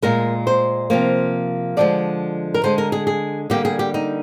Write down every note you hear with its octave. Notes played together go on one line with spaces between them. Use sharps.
A#2 G#3 A#4
C5
C3 F3 A#3
D3 F3 G#3 D5
A#4
D3 G#3 C5
A#4
G#4
G#4
D3 G3 A#3 G4
G#4
G4
D#4